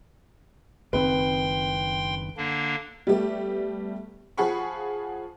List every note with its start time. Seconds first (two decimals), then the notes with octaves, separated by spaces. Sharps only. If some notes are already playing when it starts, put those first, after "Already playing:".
0.93 F#1 D#3 C4 B4 G5 C6
2.37 D3 A#3 D4
3.07 G3 A3 B3 G4
4.37 F3 G#4 F#5 B5 C#6